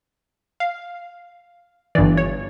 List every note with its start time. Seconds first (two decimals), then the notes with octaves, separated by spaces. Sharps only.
0.60 F5
1.95 E3 D5
1.98 G1 G2
2.17 C#5